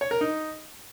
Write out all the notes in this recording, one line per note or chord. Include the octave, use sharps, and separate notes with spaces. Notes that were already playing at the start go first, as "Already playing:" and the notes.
C#5
A#4
D#4